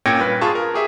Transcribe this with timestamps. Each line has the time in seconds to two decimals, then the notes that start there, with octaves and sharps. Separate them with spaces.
0.06 A#2 C#4 G5 G#6 A#6 C#7
0.20 G2 B4
0.41 F4 G#4 A5 C#6
0.55 A#4
0.74 G4 G#4 E5